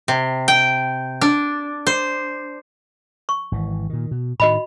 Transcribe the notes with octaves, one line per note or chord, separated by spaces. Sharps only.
C3
G5
D4
C5
C#6
G#1 E3
A#2 D#3
B2
A2 D3 D#3 F#4 D#5 B5